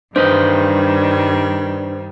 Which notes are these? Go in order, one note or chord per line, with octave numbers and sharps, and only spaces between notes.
G2 D#3 G3 D4 B4 C5 D#5